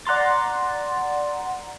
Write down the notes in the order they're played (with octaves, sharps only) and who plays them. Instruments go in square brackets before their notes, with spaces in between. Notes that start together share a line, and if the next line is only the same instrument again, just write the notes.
[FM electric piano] D5 F#5 A#5 C6 A6